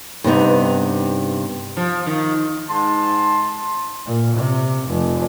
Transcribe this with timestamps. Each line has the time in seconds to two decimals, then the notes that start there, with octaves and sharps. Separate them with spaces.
0.24 G2 C3 B3 D#4
1.77 F3
2.06 D#3
2.69 G#2 A5 C6
4.05 A#2
4.37 C3
4.88 F1